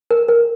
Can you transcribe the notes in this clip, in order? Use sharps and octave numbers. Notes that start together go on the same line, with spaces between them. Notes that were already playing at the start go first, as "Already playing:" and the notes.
A#4
A#4